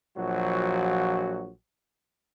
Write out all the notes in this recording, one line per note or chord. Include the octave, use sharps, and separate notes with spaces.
A#1 F3 F#3 F#4